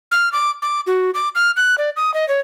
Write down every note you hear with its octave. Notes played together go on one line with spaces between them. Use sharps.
F6
D6
D6
F#4
D6
F6
F#6
D5
D#6
D#5
C#5